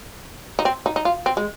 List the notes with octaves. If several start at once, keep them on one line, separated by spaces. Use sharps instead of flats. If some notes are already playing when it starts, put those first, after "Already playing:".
D#4
C4
D#4
D#4
F4
C4
G#3